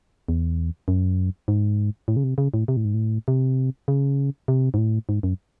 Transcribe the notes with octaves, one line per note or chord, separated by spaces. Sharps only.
E2
F#2
G#2
A2
C#3
C3
C#3
A2
C3
A2
G#2
A2
C3
C#3
C3
G#2
A2
G#2
F#2